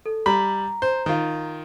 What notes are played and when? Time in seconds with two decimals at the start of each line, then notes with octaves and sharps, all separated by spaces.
0.06 A4
0.26 G3 A#5 B5
0.82 C5
1.06 D#3 F4